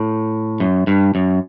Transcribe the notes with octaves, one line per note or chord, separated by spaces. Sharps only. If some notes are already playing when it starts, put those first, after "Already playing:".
Already playing: A2
F#2
G2
F#2